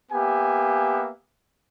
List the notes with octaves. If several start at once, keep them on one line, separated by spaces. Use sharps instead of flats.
A#3 B3 G4 E5 G#5